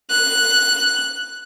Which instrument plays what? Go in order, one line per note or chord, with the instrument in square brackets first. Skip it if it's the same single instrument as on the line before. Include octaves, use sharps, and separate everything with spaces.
[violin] F#6